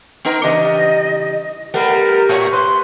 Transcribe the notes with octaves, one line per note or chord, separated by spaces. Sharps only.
B3 D#4 A#4
C#3 E3 G3 D#5
G3 A3 B3 A#4
A2 C#5
B4 C6